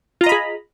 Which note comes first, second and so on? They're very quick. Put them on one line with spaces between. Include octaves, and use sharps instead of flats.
F4 A#5 D#5 B5 G#4